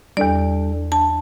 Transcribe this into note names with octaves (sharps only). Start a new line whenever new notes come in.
E2 G3 D4 A4 D5
D4 A5